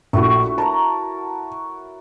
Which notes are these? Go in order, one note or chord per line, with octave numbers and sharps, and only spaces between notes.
A#1 A3 E4 F#4
A#4 C#5 A5 A#5